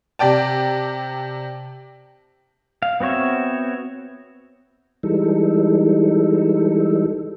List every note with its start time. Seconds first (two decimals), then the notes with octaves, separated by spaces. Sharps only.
0.19 C3 D5 G5 A5
2.83 F5
3.00 B3 C4 F#4 C#5 E5
5.03 E3 G3 G#3 D#4 A4